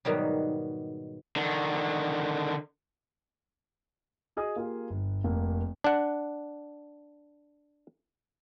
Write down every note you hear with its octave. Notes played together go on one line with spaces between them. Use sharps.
G#2 B2 D#3 F#3 G3
D3 D#3
F#4 G#4 D#5 D#6
A#3 F4 G4 G#4
G1
F1 A#3
D4 F#5